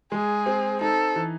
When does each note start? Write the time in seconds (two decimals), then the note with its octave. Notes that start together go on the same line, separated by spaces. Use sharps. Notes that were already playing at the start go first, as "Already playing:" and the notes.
0.12 G#3 G#4
0.46 C4
0.81 D#4 A4
1.16 E3